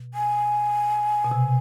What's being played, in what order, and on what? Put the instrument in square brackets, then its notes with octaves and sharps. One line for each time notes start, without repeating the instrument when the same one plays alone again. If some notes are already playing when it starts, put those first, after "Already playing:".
Already playing: [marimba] B2
[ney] G#5
[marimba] B2
C3